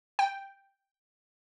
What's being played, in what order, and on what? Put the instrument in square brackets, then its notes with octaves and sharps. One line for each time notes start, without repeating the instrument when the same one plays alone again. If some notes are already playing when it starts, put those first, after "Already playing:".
[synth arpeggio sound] G5